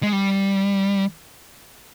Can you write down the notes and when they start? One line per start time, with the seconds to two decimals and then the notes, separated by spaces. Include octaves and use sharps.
0.03 G#3
0.13 G3